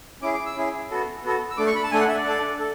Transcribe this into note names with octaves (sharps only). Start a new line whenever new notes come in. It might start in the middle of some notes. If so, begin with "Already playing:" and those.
C#4 E4 G#4 D6
D6
E6
C#4 E4 G#4
B3 F#4 A4
B3 F#4 A4
E6
A3 D4 A4 D6
C#6
B5
A5
A3 D4 A4 G#5
F#5
E5
D5
D4 A4
A4